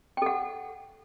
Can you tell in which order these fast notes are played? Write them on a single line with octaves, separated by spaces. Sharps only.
G5 A4 F#5